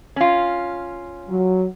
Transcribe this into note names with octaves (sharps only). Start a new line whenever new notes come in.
C#4 F4
F#3